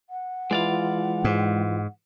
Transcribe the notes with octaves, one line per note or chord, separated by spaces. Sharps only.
F#5
E3 G#3 E4 F4 D5 F5
G#2